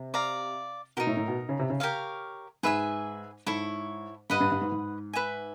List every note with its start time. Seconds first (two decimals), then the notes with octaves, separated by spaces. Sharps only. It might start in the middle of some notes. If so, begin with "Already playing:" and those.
Already playing: C3
0.14 D5 F5 A#5
0.97 B2 D#4 G4 A#4
1.07 A2
1.17 A2
1.28 B2
1.49 C#3
1.59 C3
1.70 C#3
1.80 G4 A#4 C#5 F5
2.63 G#2 G#4 B4 E5 G#5
3.46 G#2 E4 A4 C#5
4.30 G2 B4 D#5 F#5 B5
4.41 G2
4.52 G2
4.61 G#2
4.72 G#2
5.13 B4 E5 G#5